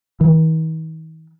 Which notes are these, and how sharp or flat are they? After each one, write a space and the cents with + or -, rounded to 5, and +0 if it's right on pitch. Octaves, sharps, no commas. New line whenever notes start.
D#3 +45